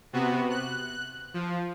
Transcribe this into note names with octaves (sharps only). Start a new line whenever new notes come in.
C3 B3 F#4
F#6
F3